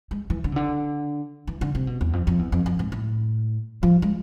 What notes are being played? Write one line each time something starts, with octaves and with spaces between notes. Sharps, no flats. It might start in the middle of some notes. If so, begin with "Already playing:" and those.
G#3
E3
D3
C3
D3
E3
D3
C3
B2
E2
F2
F2
E2
F2
F2
G#2
A2
F3
G#3